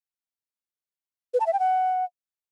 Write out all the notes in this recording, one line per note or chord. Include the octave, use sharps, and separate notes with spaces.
B4
A5
E5
G5
F#5